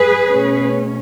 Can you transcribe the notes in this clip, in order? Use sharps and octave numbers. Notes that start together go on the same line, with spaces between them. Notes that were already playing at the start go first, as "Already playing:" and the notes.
Already playing: G#4 B4
B2 A3 C#4